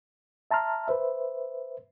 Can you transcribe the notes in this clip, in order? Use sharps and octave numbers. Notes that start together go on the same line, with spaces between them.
E5 A5 A#5 C6 F6
B4 C5 E5